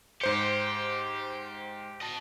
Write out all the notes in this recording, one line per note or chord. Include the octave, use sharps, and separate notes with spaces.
G#2 G4 C5 C#7
D#5 A5